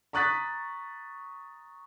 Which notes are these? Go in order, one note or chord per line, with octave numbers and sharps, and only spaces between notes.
A#5 C#6 D#6 F#6 A6 B6